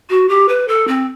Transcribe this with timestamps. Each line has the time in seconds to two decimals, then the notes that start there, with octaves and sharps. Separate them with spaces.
0.10 F#4
0.29 G4
0.48 B4
0.68 A4
0.88 C4